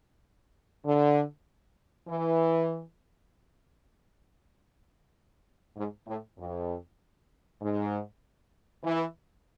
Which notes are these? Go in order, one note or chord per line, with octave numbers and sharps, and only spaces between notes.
D3
E3
G#2
A2
F2
G#2
E3